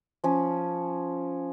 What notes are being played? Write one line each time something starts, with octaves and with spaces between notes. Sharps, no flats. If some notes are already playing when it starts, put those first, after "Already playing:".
F3 C#4